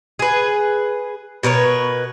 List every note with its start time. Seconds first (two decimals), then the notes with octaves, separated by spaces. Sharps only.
0.19 G#4 B4
1.43 B2 A#4 B4 C#5